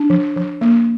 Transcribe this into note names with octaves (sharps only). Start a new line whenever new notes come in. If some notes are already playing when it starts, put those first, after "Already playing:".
Already playing: D4
F3
F3
A#3